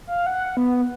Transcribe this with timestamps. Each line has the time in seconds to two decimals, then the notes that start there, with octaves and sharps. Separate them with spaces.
0.07 F5
0.26 F#5
0.57 B3